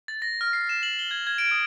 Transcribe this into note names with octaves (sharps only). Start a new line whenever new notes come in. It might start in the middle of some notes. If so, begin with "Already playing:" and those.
A6
A#6
F6
C7
E7
F#7
G7
G#6
G#6
D7
D#6